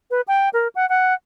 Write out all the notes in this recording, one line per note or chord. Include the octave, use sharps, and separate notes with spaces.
B4
G5
A#4
F#5
F#5